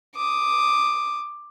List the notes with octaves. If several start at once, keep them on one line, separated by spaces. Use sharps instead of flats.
D6 D#6